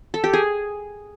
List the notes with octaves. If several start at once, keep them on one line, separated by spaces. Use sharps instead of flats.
A4
G4
G#4